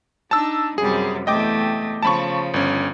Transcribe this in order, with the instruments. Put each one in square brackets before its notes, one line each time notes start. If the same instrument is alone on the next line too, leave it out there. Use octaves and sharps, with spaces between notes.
[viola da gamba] D4 D#4 [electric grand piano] A5 E6
[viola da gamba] F#2 C3 G3 [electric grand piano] G#4
[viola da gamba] E2 A3 [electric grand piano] D#5 G5 D6
[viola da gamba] C#3 F3 [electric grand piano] A5 B5 C#6
[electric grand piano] G1 C#4